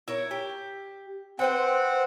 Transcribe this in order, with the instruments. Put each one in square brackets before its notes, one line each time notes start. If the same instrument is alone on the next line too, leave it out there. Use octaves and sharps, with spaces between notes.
[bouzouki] E4 A#4 C#5
G4
[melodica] C4 F#5 [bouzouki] B4 C5 G5